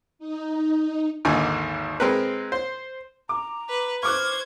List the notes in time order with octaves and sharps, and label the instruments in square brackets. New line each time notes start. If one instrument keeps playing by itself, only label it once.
[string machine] D#4
[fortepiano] G#1 D#2 G#2 D3 G#5
G#3 C4 A#4 B4
C5
[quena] A#5 [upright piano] D6
[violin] B4
[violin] C5 G#6 [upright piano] C#6 D6 F#6 [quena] F6